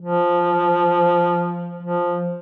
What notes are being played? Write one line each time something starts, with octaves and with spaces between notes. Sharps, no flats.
F3
F3